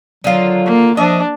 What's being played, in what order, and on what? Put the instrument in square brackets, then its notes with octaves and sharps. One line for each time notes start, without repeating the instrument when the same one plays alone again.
[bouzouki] D3 D#3 F4 [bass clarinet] F#3
[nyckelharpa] A#3
[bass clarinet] F3 [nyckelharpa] D4 [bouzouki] D#5 E5